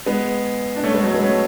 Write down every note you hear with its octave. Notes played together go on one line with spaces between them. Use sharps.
G#3 B3
D4
A3 C#4
G#3 B3
F#3 A3
G#3 B3
A3 C#4